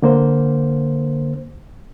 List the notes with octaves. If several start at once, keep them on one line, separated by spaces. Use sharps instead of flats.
D3 A#3 C5